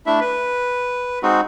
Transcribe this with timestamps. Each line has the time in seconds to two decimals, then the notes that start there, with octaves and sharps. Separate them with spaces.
0.06 A3 D4 E4 E5
0.21 B4
1.23 G#3 C4 D#4 F#4